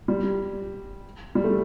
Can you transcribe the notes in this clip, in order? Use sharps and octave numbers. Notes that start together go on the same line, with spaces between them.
G3
G3
A3